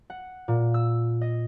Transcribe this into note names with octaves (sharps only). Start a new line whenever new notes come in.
F#5
A#2
E6
D#5